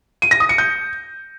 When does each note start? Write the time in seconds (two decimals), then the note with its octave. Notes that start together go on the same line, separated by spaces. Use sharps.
0.22 D#7
0.31 A#6
0.40 D#6
0.49 C#7
0.58 G6